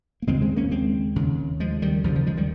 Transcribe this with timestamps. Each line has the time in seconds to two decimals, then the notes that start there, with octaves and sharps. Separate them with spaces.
0.22 A#3
0.27 D#2 C#3 G#3 C4
0.42 G#3 C4
0.56 A#3 C#4
0.71 G#3 C4
1.16 D#2 C#3
1.60 F3 G#3
1.82 D#3 G3
2.04 D#2 C#3 F3
2.15 F3
2.27 F3 G#3
2.37 D#3 G3